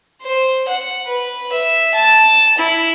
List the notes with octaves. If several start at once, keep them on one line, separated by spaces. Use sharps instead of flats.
C5
F#5
B4
E5
A5
E4